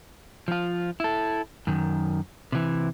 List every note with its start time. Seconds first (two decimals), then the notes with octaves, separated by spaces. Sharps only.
0.48 F3 F4
1.00 E4 A4
1.67 F#2 D#3
2.52 C3 E3